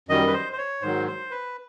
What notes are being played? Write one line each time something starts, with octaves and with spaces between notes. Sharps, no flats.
F#2 D#3 G3 D#5
B4
C5
C5
C#5
G#2 D#3 F#3 C5
C5
B4